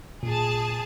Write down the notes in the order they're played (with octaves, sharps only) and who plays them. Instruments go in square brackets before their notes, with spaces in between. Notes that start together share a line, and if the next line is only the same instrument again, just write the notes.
[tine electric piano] A#2 [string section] G#4 A5